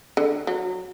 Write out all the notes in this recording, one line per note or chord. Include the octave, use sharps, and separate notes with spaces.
D3
F#3